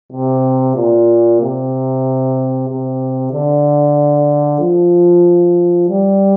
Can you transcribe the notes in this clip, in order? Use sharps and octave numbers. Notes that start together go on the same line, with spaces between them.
C3
A#2
C3
C3
D3
F3
G3